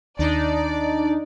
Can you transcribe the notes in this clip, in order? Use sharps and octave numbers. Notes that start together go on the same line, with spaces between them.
D#2 D4 D#4 D5